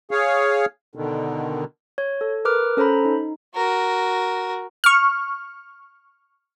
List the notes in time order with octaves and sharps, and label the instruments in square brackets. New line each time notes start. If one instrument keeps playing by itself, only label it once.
[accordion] G#4 C#5 F5
B2 D3 D#3
[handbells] C#5
A4
A#4 B4 D6 F6
C#4 A4 C5 A#5 B5
D#4
[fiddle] F#4 A#4
[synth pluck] C#6 F6